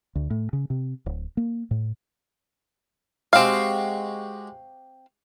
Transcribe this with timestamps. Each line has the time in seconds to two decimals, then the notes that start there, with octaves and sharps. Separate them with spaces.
0.15 D2
0.30 A2
0.53 C#3
0.70 C3
1.06 D1
1.37 A#3
1.71 A2
3.33 G#3 C4 F#4 G4 F5